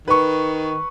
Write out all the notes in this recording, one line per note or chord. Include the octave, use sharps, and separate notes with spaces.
D#3 B4 C#6